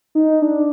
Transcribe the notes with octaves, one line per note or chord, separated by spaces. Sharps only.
D#4
D4